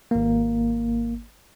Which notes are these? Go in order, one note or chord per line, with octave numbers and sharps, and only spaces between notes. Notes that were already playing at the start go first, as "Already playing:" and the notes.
G#1 A#3